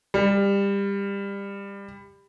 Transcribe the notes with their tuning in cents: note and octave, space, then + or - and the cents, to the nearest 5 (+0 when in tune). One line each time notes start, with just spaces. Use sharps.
G3 +25